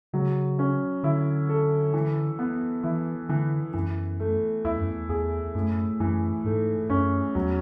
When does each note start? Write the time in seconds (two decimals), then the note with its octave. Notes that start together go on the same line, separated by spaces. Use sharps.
0.13 C#3 F#3
0.59 C#4
1.03 D3 E4
1.49 A4
1.93 E3
2.39 B3
2.83 E3 E4
3.29 D3 E3
3.73 F#2 E3
4.20 A3
4.64 E2 E4
4.77 F#2
4.91 E2
5.09 E2 G#4
5.55 F#2 A2
6.00 F#2 E3
6.44 G#2 A3
6.90 F#2 C#4
7.35 E2 F#3